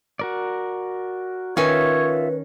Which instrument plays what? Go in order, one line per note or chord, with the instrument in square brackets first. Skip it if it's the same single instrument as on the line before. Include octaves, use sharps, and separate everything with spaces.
[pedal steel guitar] F#4 A#4 D5
[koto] D#3 C#4 [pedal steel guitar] F4 E5 [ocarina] B4 [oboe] C#5